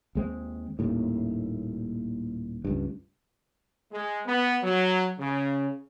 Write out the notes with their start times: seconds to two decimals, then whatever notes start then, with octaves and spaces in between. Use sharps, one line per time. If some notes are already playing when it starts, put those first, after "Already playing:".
0.15 D#2 G#3 C4
0.79 D#1 D#2 A2
2.65 C#2 G2
3.92 G#3
4.26 B3
4.63 F#3
5.19 C#3